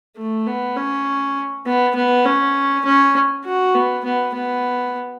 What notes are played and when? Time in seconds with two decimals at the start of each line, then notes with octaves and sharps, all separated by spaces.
0.17 A3
0.47 B3
0.77 C#4
1.66 B3
1.95 B3
2.25 C#4
2.86 C#4
3.45 F#4
3.75 B3
4.05 B3
4.35 B3